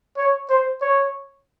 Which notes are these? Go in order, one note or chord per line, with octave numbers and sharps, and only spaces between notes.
C#5
C5
C#5